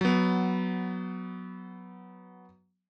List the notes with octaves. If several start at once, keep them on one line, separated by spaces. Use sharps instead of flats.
F#3 B3